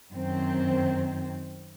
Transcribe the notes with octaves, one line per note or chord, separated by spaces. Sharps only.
F#2 D#3 C4